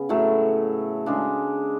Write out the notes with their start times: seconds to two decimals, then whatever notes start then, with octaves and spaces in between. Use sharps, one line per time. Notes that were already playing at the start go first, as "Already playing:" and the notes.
Already playing: C#3 B3
0.09 A2 F#3 A3
1.06 C#3 G#3 D4